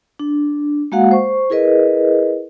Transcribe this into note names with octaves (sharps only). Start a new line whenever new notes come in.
D4
G#3 A#3 F#4 F5 F#5
C5 C#6
E4 G#4 A#4 B4 D#5